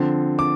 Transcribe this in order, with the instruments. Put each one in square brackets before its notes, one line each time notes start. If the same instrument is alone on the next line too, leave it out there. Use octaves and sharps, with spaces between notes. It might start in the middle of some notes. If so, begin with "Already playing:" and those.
Already playing: [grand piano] D3 F3 C4
D6